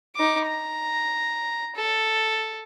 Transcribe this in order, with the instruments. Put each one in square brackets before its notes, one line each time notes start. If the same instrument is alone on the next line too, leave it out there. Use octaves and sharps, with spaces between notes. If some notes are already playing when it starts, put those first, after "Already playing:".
[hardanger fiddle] D#4 D6
A#5
A4